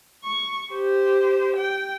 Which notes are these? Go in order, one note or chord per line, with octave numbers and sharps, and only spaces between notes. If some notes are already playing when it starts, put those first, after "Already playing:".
C#6
G4 C5
G5